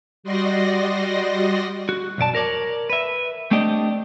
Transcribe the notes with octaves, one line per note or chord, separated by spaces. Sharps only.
G3 F#4 D5 D#5 C6 A#6
F#4
B1 F#2 D5 A5
A#4 C#5 D5
B4 E5
A3 C4 D4 G4 D5 D#5